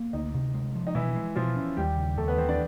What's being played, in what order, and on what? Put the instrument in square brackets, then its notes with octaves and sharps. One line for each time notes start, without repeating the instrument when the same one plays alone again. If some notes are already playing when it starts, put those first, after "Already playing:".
Already playing: [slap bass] A#3
[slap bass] D2 [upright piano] D#4
[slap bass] C3
G#3
F3
[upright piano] D#4
[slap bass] B2 [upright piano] E3 E4
[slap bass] G#3
[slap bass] B2 [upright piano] F3 F4
[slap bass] C#4
[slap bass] D#2 [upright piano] G3 G4
[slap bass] C#3
[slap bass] D#2 [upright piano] A3 A4
[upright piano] B3 B4
[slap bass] E3 [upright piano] C4 C5
[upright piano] D4 D5